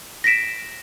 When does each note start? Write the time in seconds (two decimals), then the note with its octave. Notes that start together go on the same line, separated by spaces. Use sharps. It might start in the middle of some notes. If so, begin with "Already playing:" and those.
0.24 A#6 B6 D7 E7